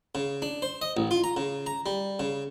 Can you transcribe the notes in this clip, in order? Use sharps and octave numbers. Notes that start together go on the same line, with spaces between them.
C#3
D4
C5
D#5
A1
F4
A#5
C#3
A#5
G3
C#3